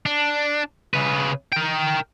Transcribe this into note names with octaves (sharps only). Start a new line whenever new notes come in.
D4
C#3 B4
A#4 G5